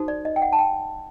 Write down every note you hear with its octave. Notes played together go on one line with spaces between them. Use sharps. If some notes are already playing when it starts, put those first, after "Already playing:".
Already playing: D#4 F#4 A4 C5
D5
D#5
G5
F#5
A5
G5